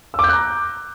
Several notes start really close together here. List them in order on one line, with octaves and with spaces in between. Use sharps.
E6 D6 G6 F#6 A#5